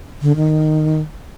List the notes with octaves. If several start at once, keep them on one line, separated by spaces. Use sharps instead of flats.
D3
D#3